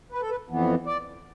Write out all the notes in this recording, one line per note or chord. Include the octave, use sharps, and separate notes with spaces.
B4
A4
B4
F2 E3 B3
D5